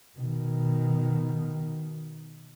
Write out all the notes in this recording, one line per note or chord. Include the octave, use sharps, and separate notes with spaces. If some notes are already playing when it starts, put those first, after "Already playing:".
B2 D#3